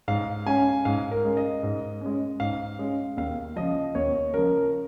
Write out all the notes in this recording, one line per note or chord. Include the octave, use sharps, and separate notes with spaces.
G#2 F5
G#3 C#4 G#5
G#2 F5
A#4
G#3 C#4
D#5
G#2
G#3 C#4
G#2 F5
G#3 C#4
D#2 F5
C#3 F3 D#5
D#2 C#5
C#3 F3 A#4